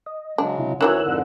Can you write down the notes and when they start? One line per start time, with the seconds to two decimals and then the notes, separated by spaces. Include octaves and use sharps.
0.06 D#5
0.38 C#3 F#3 G#3 D4
0.59 C3 E4
0.81 D2 D#3 E3 F#3 A#4 C#5 E6 F#6
1.02 F2 G#2 D3